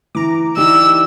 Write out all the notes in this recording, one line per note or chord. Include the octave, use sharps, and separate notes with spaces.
E3 A#5 D6
E3 D#4 G4 D5 E6